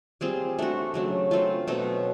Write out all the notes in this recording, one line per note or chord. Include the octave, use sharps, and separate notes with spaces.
G3 C4 F4 G#4
A3 D4 F#4
C#3 F#3 A3 D4
A3 C4 F4
B2 F#3 A3 C4